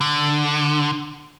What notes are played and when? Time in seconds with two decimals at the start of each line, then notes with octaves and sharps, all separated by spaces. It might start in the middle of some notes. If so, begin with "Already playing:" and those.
0.01 D3